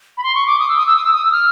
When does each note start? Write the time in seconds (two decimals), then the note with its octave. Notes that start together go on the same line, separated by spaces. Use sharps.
0.17 B5
0.24 C6
0.35 C#6
0.47 D6
0.59 D#6
0.69 E6
0.77 D#6
0.87 E6
0.96 D#6
1.05 E6
1.13 D#6
1.25 E6
1.32 F6